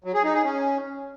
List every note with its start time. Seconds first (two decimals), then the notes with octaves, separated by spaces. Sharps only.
0.04 F#3
0.14 G#4
0.24 D#4
0.34 G#4
0.43 C#4